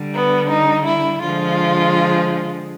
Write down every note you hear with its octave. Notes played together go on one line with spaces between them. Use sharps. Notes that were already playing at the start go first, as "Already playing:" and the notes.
Already playing: D3 G3
B3
D#4
E4
D3 F3 G#3 F4